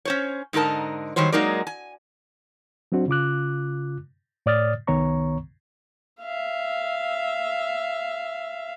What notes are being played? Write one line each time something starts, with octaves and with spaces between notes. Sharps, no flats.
C#4 C5 C#5
G#2 D3 D#4 A#4 A5
D#3 F#3 G3 C5 C#5
F#3 G#3 A#3 D#4 A#4 D5
G#5
F#3 C4 D4 F#4 C5
C#3 F4 D6 F#6
A2 C#5 D5 D#6 F6 A6
C2 D#3 B3 C#5 A#5 C#6
E5 F5